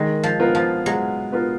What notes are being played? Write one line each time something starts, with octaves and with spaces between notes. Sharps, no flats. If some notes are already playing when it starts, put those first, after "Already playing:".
Already playing: D#3 G#3
F3
B3 F4 A#4
F3
F#3 G#3
B3 F4 A#4